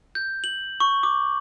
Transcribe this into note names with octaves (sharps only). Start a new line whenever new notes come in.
G6
F#7
C#6
D6